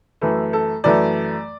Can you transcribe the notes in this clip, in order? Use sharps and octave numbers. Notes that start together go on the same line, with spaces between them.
F#2 E3 A3
A4
F#2 E3 A3 D5